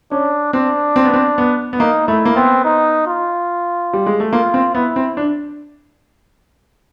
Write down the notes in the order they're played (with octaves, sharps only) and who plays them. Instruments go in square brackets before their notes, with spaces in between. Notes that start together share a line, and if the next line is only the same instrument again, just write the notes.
[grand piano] C#4 [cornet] D4
[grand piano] C4 [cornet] D4
[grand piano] C4
B3
C4
B3
B3
[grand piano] A#3 [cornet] D#4
[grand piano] A3 [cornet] E4
[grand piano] A#3
[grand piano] B3 [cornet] C4
[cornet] D#4
F4
[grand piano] G3
G#3
A3
[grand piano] A#3 [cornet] F4
[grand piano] C4
[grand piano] B3 [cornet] E4
[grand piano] C4
D4